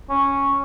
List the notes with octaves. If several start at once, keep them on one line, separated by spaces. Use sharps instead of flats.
C#4